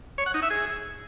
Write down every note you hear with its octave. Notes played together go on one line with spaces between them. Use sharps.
C#5
F#5
D#4
E5
G#4